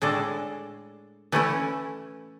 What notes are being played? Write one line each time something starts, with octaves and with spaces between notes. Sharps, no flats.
A2 G#3 D4 A4
E3 A3 C#4 E4